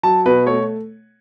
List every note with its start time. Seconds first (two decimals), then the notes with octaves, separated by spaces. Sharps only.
0.03 F#3 A5
0.26 B2 B4
0.47 A3 C#5